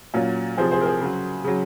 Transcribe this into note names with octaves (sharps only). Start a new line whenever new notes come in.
A#2 F#3 C#4 F4
C3 F3 G#4 C5
G#4 C5
A#4
G#4 C5
C#3 F#3
C#3 F#3